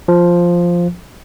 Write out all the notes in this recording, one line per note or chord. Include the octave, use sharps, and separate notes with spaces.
F3